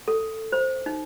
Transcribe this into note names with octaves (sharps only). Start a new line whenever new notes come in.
A4
C5
D#4